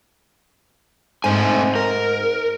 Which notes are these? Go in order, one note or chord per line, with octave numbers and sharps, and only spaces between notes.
G#2 A3 C4 G#5
A#4